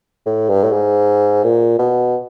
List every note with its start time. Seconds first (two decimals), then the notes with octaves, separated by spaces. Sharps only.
0.26 A2
0.49 G2
0.64 A2
0.72 G#2
1.44 A#2
1.79 B2